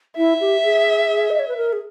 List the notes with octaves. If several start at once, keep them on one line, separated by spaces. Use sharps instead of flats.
E4 E5
G4
G#4
D#5
C#5
B4
A#4
G#4